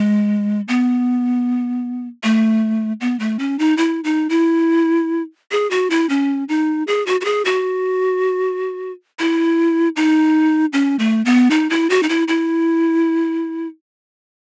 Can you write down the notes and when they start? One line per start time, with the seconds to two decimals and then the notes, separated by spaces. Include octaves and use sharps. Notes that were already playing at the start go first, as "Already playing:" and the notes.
Already playing: G#3
0.68 B3
2.23 A3
3.01 B3
3.20 A3
3.39 C#4
3.59 D#4
3.77 E4
4.04 D#4
4.30 E4
5.51 G#4
5.71 F#4
5.90 E4
6.09 C#4
6.49 D#4
6.87 G#4
7.07 F#4
7.21 F#4
7.25 G#4
7.45 F#4
9.19 E4
9.96 D#4
10.73 C#4
10.99 A3
11.25 B3
11.51 D#4
11.70 E4
11.90 F#4
12.03 D#4
12.09 E4
12.28 E4